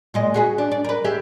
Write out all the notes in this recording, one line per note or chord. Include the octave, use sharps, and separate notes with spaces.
A#2 G#3 D#5
F#4 G#4 B4
D4
D5
A#4 B4
G4 G#4 E5